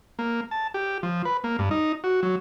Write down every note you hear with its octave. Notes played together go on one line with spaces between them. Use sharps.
A#3
A5
G4
F3
B4
A#3
G2
D#4
F#4
F#3